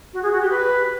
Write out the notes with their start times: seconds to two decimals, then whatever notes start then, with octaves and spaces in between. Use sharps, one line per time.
0.13 F#4
0.22 G#4
0.31 F#4
0.40 G4
0.49 B4